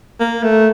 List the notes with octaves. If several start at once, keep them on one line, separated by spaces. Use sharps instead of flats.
A#3
A3